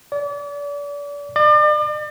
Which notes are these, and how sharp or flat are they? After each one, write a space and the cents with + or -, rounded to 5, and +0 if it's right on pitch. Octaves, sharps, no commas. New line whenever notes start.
D5 -35
D5 +40